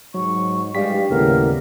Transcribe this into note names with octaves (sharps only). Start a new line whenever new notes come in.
G#2 F#3 C#6
G2 G3 G#3 F5 B6
D#2 A2 C#3 B3 A#4